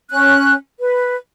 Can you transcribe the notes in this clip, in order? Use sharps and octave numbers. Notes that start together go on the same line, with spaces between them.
C#4 F#6
B4